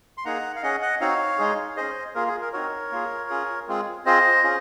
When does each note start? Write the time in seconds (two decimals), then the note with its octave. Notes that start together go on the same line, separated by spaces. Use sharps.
0.18 C6
0.25 A#3 D#4 G#4 F#5 A#5
0.56 F5
0.63 C#4 G#4 D#5 F#5
0.82 D#5 F#5
1.01 C4 D#4 F#4 C#5 F5
1.38 G#3 D#4 G#4
1.77 C#4 G#4 C5 D#5
2.15 A#3 F4 G#4 A#4
2.27 G#4
2.41 A#4
2.53 C4 D#4 F#4 A#4 C#5
2.92 A#3 F4 G#4
3.30 C#4 F4 G#4
3.68 G#3 C4 F4 G#4
4.05 C4 F4 G#4 C5 D#5
4.43 C#4 F4 G#4